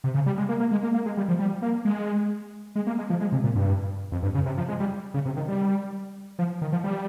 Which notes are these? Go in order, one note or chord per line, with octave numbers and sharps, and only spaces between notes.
C3
C#3
G3
G#3
A#3
A#3
G#3
A#3
A#3
G#3
G3
F3
G3
A#3
G#3
G#3
A#3
G#3
F3
G#3
C3
A#2
G2
F2
G2
C#3
C3
F3
G#3
G3
C#3
C3
D#3
G3
F3
D#3
F3
G3